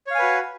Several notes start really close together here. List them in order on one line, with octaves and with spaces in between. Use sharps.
C#5 F5 G#5 B4 F#4